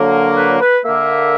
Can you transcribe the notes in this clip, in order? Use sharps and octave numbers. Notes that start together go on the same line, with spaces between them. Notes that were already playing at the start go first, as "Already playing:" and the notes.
Already playing: D3 F#3 A#3
B4
B4
D3 A#3 E5